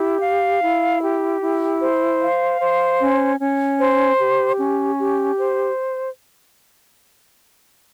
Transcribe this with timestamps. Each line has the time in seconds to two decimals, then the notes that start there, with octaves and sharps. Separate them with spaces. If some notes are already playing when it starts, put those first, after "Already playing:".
Already playing: E4 G4
0.21 F5
0.61 E4
1.01 G4
1.40 E4
1.80 C5
2.20 F5
2.59 C5
3.00 C#4
3.39 C#4
3.79 C5
4.19 G4
4.59 C#4
4.99 G4
5.38 C5